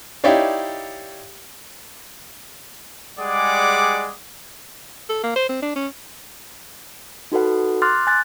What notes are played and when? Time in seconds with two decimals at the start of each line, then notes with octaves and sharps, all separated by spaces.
0.24 D#4 E4 G4 C#5 D5 F5
3.19 G3 G#3 G#4 D5 F#5 D6
5.10 A4
5.24 A#3
5.36 C5
5.49 C4
5.62 D4
5.76 C#4
7.32 D#4 F#4 A4 B4 F#5
7.82 C6 D6 F6 F#6 A6
8.07 G#5 F#6 A6